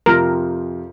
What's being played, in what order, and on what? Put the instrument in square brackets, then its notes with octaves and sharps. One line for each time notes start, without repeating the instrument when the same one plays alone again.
[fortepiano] F2 C3 F3 [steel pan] A#4